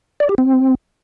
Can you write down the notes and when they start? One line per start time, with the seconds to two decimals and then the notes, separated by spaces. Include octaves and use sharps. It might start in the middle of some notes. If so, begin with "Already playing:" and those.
0.20 D5
0.29 G4
0.38 C4